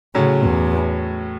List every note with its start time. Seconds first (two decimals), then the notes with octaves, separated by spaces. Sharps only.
0.15 A2 C#3 F#3 C#4
0.44 E2